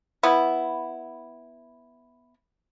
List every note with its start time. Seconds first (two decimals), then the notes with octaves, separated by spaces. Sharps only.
0.23 B3 E4